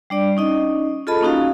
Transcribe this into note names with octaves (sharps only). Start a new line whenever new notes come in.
G3 D4 D5
C#4 D#4 D#5
F4 G#4 A4 D#5 A5 B5
A#3 C#4 D#4 F#4 F5